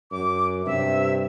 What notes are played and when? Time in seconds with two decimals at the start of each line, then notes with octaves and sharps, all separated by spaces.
0.11 F#2 D6
0.66 G2 C3 E5